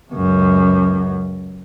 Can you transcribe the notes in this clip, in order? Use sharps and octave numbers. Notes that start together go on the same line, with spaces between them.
C#2 F#2